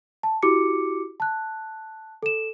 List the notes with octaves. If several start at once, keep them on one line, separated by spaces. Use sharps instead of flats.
A5
E4 F#4 G4 D6 C#7
A5 F#6
A4 E7